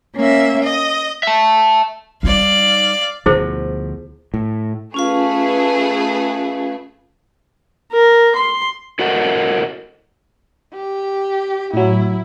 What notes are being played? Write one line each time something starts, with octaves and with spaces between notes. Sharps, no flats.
A#3 C#4 E5
D#5
E5 A5
G3 D#4 D5 F5
D2 B2 F3 E4 G#4 C5
A2
A3 C#4 F4 G#4 B4 F5
A#4
C6
E4 F#4 A4 A#4 D#5 F#5
G4
A2 F#3 E4